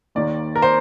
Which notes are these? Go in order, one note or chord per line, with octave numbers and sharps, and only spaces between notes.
D#2 D#3 A#3 D5
A#4
C5